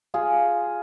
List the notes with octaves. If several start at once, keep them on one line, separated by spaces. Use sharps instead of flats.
F4 G#4